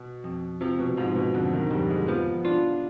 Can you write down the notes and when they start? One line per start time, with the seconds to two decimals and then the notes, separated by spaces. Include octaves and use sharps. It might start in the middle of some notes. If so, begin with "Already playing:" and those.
Already playing: B2
0.24 F2
0.61 C3 F3
0.79 B2
0.97 G#2 F3
1.16 B2
1.34 F2 D3
1.53 D#3
1.71 F2 G3
1.90 G#3
2.08 F3 B3
2.45 D4 F4